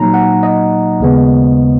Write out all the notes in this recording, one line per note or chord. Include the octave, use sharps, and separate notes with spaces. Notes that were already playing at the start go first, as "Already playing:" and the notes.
Already playing: A#2 F#3 A#3 D#4 A#5
F#5
D#5
D#2 C#3 G#3 B3